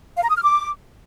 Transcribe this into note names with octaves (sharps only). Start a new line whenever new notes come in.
F5
A#5
D#6
F6
D6